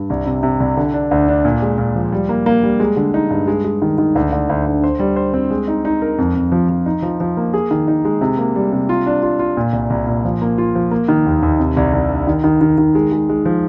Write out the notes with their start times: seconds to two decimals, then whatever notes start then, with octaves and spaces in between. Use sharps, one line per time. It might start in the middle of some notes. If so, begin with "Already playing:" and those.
Already playing: G2
0.10 C2
0.26 C3
0.43 C3
0.60 C2
0.77 D3
0.94 D4
1.11 D2
1.28 D4
1.45 A#2
1.62 G#3
1.78 A#2
1.95 F3
2.12 G3
2.29 A#3
2.46 A#3
2.63 G3
2.80 G#3
2.96 D3
3.14 D#4
3.31 G2
3.48 G#3
3.64 G#3
3.82 D#3
3.98 D#3
4.15 D2
4.32 D2
4.49 D2
4.66 D2
4.84 C5
5.00 G3
5.16 C5
5.34 C4
5.51 G#3
5.68 D#4
5.85 D#4
6.02 A#4
6.18 F2
6.35 F2
6.52 F3
6.69 F3
6.86 D#4
7.02 F3
7.20 F3
7.37 A#3
7.54 G#4
7.71 D#3
7.88 D#4
8.05 G#3
8.21 C3
8.38 A#3
8.56 G3
8.72 C3
8.89 F4
9.06 D4
9.23 F4
9.39 F4
9.57 A#2
9.73 C2
9.90 C2
10.07 A#2
10.25 F3
10.42 A#3
10.58 F4
10.75 F3
10.91 A#3
11.08 D#3
11.26 D#2
11.43 D#2
11.59 C3
11.76 C2
11.93 C2
12.10 D4
12.27 D#3
12.44 D#3
12.61 D#3
12.78 D#3
12.95 G#3
13.12 G#3
13.29 G#3
13.45 F3